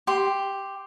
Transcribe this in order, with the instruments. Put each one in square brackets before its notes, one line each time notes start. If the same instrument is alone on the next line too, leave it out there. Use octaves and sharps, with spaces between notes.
[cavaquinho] G4 C6